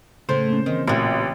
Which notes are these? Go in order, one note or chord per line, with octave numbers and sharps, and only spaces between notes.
A2 C#3 A3 C5
A#3 C#4
D#3 E3 C4
A1 A#2 F#4